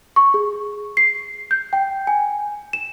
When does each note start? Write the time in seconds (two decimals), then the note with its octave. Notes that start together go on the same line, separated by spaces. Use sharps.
0.16 C#6
0.34 G#4
0.97 C7
1.51 G6
1.73 G5
2.07 G#5
2.73 E7